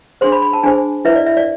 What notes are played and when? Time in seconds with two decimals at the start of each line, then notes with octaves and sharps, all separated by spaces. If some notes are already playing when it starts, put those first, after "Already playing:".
0.21 D4 G#4 C5 C6
0.32 B5
0.42 B5
0.53 A5
0.63 D4 G#4 C5 G#5
1.05 E4 B4 E5
1.16 D5
1.26 E5
1.37 D5